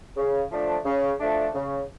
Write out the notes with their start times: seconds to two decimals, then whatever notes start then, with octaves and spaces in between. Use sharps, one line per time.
0.17 C#3
0.51 F3 A3 D4
0.85 C#3
1.20 F3 A3 D4
1.54 C#3